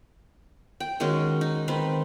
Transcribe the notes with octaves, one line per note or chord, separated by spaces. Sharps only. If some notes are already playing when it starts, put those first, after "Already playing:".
G5
D#3 G#3 C#4 F#4
D#4
D#3 C4 B4